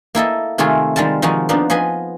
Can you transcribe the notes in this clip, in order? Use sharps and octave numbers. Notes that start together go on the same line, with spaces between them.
A#3 E4 A4 D#5
C3 D#3 A3 F4 G#4
D#3 G3 G#3 F4 A5
D#3 F3 G#3 D#4 F#4
F3 A#3 B3 D4 D#4
F3 G#4 B4 D#5 G#5